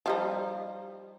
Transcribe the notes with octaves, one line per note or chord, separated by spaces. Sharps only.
F3 G3 D#4